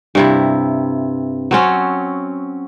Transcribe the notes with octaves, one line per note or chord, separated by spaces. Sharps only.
G2 C3 E4
F#3 C4 C#4